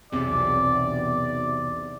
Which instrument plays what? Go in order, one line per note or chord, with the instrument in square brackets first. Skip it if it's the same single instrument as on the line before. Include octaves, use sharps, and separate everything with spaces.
[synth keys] B1 E2 C3 [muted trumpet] D5